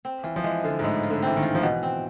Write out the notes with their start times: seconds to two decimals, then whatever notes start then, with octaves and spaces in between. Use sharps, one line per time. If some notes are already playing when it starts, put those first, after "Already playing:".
0.05 C4
0.24 E3 F4
0.36 F3
0.44 E3 G#3
0.64 D3 F4
0.79 G#2
0.83 A2 G#3
1.03 F4
1.10 D3
1.22 E3 C4
1.37 D#3
1.42 F4
1.55 F3
1.63 B2 E3
1.83 C4